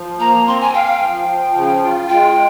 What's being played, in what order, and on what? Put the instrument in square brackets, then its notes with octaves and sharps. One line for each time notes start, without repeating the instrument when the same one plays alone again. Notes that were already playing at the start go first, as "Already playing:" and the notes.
Already playing: [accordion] F3
[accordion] A#3 [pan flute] A#5
[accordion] C4 [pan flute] C6
[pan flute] G#5
[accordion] F5 [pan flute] G5
[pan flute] G5
[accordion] F3
F3
C#3
F4
[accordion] G#3 [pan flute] G5